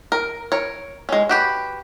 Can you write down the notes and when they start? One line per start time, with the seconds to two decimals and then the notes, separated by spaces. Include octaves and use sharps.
0.12 A#4
0.52 A#4 C#5
1.09 G#3 C#4
1.29 F#4 G4 B4